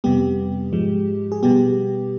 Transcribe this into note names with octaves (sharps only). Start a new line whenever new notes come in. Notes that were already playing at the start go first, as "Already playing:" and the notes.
F2 C3 G3 B3 G4
G#2 F3 G#3
G#4
B2 G3 B3 G4